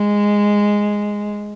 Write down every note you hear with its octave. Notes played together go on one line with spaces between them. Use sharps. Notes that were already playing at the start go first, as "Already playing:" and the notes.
Already playing: G#3